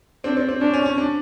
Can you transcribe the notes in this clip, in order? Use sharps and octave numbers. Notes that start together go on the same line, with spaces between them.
C4 D4
C4
C4
C#4 D4
C#4
C#4
D4